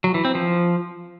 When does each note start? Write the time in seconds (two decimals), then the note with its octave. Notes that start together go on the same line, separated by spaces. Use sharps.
0.04 F#3
0.14 E3
0.25 C4
0.35 F3